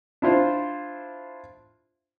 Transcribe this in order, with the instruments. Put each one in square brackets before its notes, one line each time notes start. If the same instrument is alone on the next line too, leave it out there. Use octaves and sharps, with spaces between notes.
[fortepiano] D4 E4 F4 C5